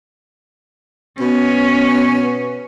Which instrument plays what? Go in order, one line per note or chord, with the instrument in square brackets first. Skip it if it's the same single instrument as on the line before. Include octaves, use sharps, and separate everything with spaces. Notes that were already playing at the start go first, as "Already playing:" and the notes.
[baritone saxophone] B2 [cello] C#4